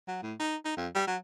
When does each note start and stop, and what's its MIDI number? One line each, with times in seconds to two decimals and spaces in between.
0.08 0.21 54
0.22 0.34 45
0.40 0.57 63
0.65 0.76 63
0.77 0.88 41
0.95 1.04 55
1.07 1.17 54